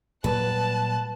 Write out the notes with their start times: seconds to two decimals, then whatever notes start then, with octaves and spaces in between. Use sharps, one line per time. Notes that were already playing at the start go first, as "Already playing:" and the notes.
0.24 A#2 F#3 G3 B4 A5 F#6